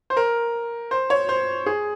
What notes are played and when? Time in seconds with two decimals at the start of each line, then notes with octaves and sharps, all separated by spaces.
0.10 C5
0.17 A#4
0.91 C5
1.10 C#5
1.29 C5
1.66 G#4